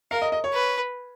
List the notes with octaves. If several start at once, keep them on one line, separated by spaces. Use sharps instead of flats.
A#4 F5
D#5
D#5
C#5
B4